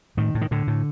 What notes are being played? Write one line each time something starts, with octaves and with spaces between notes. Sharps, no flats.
A2 D#3
A2
D#3
A2 D3
A2